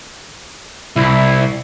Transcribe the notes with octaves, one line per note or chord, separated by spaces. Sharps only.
C2 E4